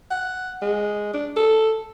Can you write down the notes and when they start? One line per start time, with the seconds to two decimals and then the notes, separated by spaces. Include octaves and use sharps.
0.11 F#5
0.62 G#3
1.13 D4
1.36 A4